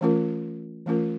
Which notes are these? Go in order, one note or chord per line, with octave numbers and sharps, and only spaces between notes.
E3 A3 C#4 F4 A#4
E3 A3 C#4 F4 A#4